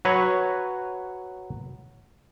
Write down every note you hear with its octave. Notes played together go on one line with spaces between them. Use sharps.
F#3 B4 C#5